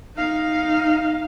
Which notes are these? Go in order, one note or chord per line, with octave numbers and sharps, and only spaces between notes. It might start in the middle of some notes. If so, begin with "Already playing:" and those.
D#4 F5